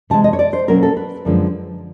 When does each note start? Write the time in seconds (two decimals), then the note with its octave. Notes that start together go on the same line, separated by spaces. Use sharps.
0.10 C3 E3 G#3 A5
0.24 D#5
0.33 C#5
0.39 D5
0.53 C5
0.68 B2 F#3 A#3 C#4 A#4
0.83 A4
0.97 B4
1.25 F#2 D3 F3 G#3 C4